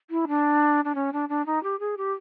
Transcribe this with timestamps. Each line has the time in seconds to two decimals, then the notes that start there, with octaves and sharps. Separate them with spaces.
0.10 E4
0.28 D4
0.84 D4
0.95 C#4
1.13 D4
1.29 D4
1.46 D#4
1.63 G4
1.79 G#4
1.97 G4